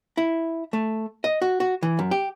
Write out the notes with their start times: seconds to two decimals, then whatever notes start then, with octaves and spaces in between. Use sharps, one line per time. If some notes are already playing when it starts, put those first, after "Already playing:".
0.17 E4
0.73 A3
1.24 D#5
1.42 F#4
1.60 F#4
1.83 E3
1.99 F#2
2.11 G4